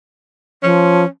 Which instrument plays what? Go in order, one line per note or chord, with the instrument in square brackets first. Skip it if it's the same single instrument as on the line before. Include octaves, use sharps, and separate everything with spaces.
[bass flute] F3 [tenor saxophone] C#4